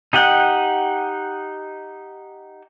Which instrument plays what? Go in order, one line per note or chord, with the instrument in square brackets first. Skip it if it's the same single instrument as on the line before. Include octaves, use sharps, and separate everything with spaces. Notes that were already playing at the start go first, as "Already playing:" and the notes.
[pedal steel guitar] D#4 G4 D#5 F#5 G5